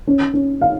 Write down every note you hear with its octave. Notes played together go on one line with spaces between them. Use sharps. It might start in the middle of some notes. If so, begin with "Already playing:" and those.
C#4
C#4
F5